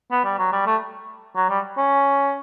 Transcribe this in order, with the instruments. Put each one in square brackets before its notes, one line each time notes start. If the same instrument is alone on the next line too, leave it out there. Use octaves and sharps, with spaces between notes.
[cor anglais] B3
G3
F#3
G3
A3
F#3
G3
C#4